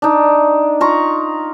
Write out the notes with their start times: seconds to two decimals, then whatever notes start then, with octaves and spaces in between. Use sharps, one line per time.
0.02 D4 D#4
0.80 F4 A#5 C#6